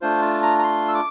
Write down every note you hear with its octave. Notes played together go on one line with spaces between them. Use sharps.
A3 D4 F4 C5
A5
A#5
A#5
C6
E6
D6